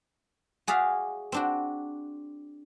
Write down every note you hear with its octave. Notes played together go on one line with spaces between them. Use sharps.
F#4 G#4 D5 E5 F5
C4 D4 F#4